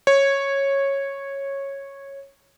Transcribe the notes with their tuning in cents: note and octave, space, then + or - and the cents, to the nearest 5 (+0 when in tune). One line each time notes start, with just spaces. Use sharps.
C#5 -10